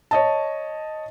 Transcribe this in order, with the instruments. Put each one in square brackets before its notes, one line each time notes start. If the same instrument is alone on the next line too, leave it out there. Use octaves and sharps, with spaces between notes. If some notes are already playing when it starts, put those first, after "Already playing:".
[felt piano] C#5 D#5 A5